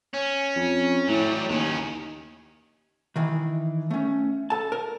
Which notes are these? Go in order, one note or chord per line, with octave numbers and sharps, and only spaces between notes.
C#4
F2
A2 F#3 G3
D#2 D#3 C#4
D#3 E3
A3 C#4
A4 A5
A#4